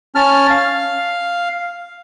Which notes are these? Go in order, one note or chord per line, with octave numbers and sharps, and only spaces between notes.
C#4 A5 F6
F5